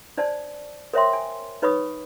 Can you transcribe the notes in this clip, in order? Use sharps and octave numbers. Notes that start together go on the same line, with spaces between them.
D4 C5 D5 A5
A#4 C5 C#5 E5 G5 C6
G#5
D#4 B4 C#5 B5 C#6 D#6